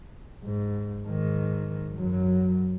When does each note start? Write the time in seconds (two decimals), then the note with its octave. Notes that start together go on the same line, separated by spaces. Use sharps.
0.45 G#2
1.08 G#2 D#3
1.95 F#2 F#3